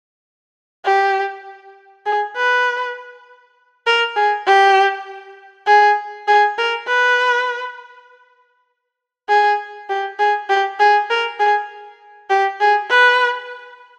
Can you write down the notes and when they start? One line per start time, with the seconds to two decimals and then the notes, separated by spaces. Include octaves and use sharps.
0.86 G4
2.06 G#4
2.36 B4
3.87 A#4
4.16 G#4
4.47 G4
5.67 G#4
6.28 G#4
6.58 A#4
6.87 B4
9.29 G#4
9.89 G4
10.19 G#4
10.50 G4
10.80 G#4
11.10 A#4
11.40 G#4
12.30 G4
12.61 G#4
12.90 B4